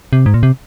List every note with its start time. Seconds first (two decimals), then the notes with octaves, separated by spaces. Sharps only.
0.13 C3
0.26 G#2
0.34 A#2
0.43 C3